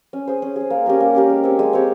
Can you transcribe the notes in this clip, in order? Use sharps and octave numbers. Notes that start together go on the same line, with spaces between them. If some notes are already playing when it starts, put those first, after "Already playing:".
C#4
G#4 C5
C#4
G#4 C5
A#3
C#4 G4 A#4
A#3
C#4 G4 A#4
G#3
C4 G4 C#5
G#3
C4 G4 C#5